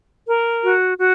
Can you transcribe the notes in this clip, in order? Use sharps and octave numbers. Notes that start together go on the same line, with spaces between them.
A#4
F#4
F#4